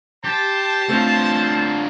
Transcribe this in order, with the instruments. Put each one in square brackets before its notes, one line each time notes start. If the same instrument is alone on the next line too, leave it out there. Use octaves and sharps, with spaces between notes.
[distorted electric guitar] G4 [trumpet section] C5 A5
[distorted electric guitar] D3 F4 [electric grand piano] A3 C4 G6